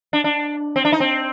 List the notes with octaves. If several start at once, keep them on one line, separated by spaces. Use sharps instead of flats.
D4
D4
C4
D4
D#4
C4